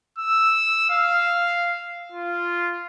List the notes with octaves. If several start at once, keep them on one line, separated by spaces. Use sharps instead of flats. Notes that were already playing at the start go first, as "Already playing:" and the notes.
E6
F5
F4